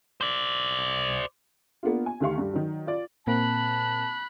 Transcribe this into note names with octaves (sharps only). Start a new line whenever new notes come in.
C5 D5
A#3 B3 D4 F4
G#5
D2 D#3 G4 F5 C#6
G2 G4
D#3 F#3
F4 D5
A#2 A#3 C4 A5 B5 F#6